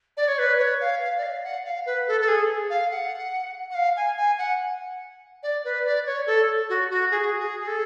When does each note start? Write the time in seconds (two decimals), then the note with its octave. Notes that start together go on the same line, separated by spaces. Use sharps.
0.17 D5
0.28 C#5
0.39 B4
0.59 C#5
0.81 F5
1.01 F5
1.17 D5
1.23 F5
1.44 F#5
1.65 F5
1.86 B4
2.07 A4
2.21 A4
2.28 G#4
2.70 F5
2.91 F#5
3.70 F#5
3.75 F5
3.96 G#5
4.17 G#5
4.38 F#5
5.43 D5
5.64 B4
5.85 D5
6.06 C#5
6.27 A4
6.69 F#4
6.90 F#4
7.11 G#4
7.39 G#4
7.60 G#4
7.67 A4